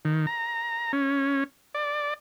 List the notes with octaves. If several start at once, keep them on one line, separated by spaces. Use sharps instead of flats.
D#3
A#5
C#4
D5